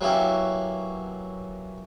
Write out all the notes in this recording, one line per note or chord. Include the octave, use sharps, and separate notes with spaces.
F#3 A#3 B3 C#4 E4 G4